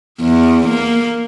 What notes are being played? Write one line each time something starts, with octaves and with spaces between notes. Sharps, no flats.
E2
A#3